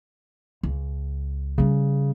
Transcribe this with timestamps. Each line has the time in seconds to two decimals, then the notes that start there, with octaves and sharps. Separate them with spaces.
0.63 C#2
1.58 C#3 G3 C#4